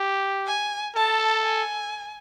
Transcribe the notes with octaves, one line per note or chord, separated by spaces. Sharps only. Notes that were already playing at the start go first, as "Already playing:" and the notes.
Already playing: G4
G#5
A4 A5
G#5